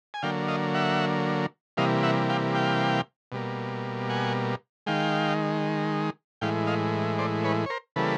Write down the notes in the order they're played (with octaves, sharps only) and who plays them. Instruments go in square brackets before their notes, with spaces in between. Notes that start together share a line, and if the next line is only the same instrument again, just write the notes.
[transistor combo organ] G#5
D3 F#3 A#3 F5 G5
D#5 F5
E5 F#5
C3 E3 G3 A#3 D#5 F5
E5 F#5
F5 G5
F5 G5
B2 G3 A#3
F#5 G#5
D#3 G#3 F5 G5
A2 E3 G#3 F5 G5
D#5 F5
C5 D5
B4 C#5
C#5
A#4 C5
C#3 E3 G3 A#3 A4 B4